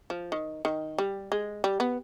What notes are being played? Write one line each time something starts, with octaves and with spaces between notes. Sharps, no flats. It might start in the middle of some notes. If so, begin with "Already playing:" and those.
F3
D#3
D#3
G3
G#3
G3
B3